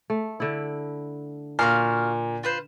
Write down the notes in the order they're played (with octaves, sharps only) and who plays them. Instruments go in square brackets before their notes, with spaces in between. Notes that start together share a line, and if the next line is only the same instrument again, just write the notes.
[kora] A3
D3 E4
[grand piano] A#2 [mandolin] F#4 F5 F6
[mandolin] F4 B4 C5